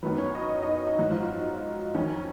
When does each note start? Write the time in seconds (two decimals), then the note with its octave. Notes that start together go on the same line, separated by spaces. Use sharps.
0.03 F#2 D#3 F#3 B3 B4
0.18 C#4 C#5
0.35 D#4 D#5
0.54 C#5
0.62 D#4 D#5
0.87 D#4 D#5
0.99 G#2 F#3 F#4
1.11 F3 F4
1.23 F3 F4
1.35 D#4
1.95 F2 D#3 F#3 C#4